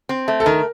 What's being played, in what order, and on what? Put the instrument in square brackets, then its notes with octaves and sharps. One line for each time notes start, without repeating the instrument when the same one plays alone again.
[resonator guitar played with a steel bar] C4
A3
[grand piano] A4
[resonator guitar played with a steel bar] D#3 [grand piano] A#4